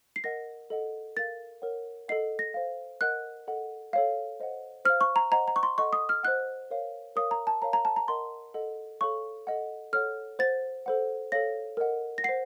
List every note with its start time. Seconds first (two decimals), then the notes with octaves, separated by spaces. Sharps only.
0.16 C7
0.24 A#4 D#5 F#5 A#6
0.70 A4 D#5 F#5
1.16 A#4 F5 A6
1.62 A#4 C#5 F#5
2.08 A4 D#5 F#5 C7
2.39 A#6
2.54 C5 F5
3.01 A#4 D#5 F#5 F#6
3.47 A4 D#5 F#5
3.93 A4 C#5 F5
4.40 C5 D#5 F#5
4.85 C5 F5 F6
5.01 C#6
5.16 A#5
5.31 C5 D#5 F#5 A#5
5.48 A#5
5.56 C#6
5.63 C6
5.78 A4 D#5 F#5 C#6
5.93 D#6
6.09 F6
6.23 C5 D#5 F#5 F#6
6.71 A#4 C#5 F5
7.16 A#4 C#5 F5 D#6
7.31 A#5
7.47 A5
7.62 A#4 C#5 F5 A#5
7.73 A#5
7.85 A5
7.96 A#5
8.08 A#4 D#5 F#5 C6
8.54 A4 D#5 F#5
9.01 A4 C#5 F5 C#6
9.47 A4 D#5 F#5
9.93 A4 C#5 F#5 F6
10.39 C5 F#5 A6
10.86 A4 C5 F#5
11.32 A4 C#5 F5 A#6
11.77 A#4 D#5 F#5
12.18 A#6
12.24 C5 F#5 C7